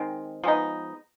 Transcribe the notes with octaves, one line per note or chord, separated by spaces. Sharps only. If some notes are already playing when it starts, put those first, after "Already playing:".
Already playing: D#3 G#3 C4
F3 G#3 B3 D#4